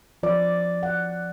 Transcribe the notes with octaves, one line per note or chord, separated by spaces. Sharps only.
F3 D5
F#5